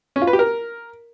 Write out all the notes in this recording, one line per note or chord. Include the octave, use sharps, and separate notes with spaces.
C#4
F4
B4
G4
A#4